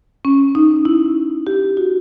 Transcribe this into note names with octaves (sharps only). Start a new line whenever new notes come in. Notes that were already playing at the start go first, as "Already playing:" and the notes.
C#4
D#4
E4
G4
F#4